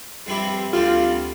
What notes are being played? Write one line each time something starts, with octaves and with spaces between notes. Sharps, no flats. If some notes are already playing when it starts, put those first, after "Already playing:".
G2 F3 C4 E4 G4
D2 D3 G3 C4 F4 G4